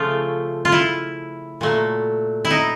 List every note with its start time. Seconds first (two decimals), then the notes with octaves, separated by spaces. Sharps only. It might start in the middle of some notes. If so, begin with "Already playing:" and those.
Already playing: C#3 F3 A3 F4
0.65 F4
0.72 E4
1.61 A#2 F#3 A3
2.45 E4
2.51 D#4